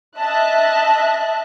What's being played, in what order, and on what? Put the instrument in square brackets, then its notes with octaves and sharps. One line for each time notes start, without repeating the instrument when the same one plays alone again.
[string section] D#5 E5 A5 F#6